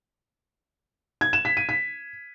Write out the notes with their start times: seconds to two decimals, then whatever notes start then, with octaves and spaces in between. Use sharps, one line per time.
1.21 G#6
1.33 E7
1.45 B6
1.57 D#7
1.69 B6